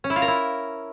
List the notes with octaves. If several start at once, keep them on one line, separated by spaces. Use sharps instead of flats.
C#4
E4
F4
A#4
E4